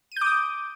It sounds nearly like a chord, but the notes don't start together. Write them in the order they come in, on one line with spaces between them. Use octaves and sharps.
D#7 G6 D6 D#6